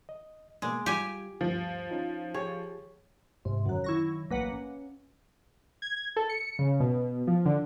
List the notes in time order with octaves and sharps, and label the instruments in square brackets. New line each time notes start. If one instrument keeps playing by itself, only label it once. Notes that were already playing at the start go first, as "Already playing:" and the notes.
[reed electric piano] D#5
[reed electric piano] B2 A#3 D6 [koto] G#3
[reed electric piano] G3 F4 [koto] G4 G#5
[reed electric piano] D2 G2 [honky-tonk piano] F3
[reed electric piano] C#4 D#4 F4
[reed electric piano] G4 G#4 [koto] C#5
[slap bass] G#2 [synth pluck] C3
[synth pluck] F#2 F#3 [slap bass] D3 D#3
[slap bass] D#3 F#3 [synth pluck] E4 C#6 A#6
[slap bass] A1 F#3 [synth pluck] A#3 B4 F#5
[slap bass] C#4
[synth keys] G#6
A4
C#7
C#3
B2
F3
D3